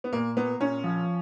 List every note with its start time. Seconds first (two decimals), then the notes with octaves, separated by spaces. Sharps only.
0.04 B3
0.13 A#2 A#3
0.37 A#3 B3
0.61 A#2 C#4
0.84 F3